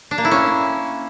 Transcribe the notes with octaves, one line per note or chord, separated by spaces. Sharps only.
D4
A#3
E4
C#4